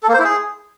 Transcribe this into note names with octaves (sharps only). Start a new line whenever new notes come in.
A4
A#3
C5
E4
G#4